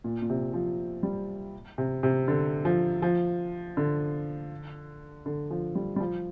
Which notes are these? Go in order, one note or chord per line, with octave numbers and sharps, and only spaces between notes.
A#2
A#2
C3
F3
G3
C3
C3
D3
F3
F3
D3
D3
F3
G3
G3
F3